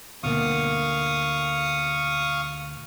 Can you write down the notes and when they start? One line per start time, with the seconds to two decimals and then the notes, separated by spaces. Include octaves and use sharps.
0.23 D2 B2 A#3 F5 C#6 D#6